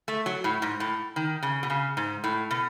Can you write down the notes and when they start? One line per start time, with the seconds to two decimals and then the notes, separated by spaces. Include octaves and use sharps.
0.08 A3
0.26 F#3
0.44 A2
0.62 G#2
0.80 A2
1.16 D#3
1.43 C#3
1.63 B2
1.70 C#3
1.97 G#2
2.24 A2
2.51 B2